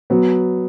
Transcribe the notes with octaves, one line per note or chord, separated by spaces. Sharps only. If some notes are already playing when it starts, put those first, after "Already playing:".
F#3 B3